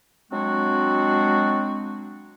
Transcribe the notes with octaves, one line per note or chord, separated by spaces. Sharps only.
F#3 G#3 C4 D4 F#4